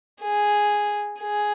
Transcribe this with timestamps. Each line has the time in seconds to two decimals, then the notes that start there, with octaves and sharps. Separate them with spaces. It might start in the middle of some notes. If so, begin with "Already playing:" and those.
0.22 G#4
1.20 G#4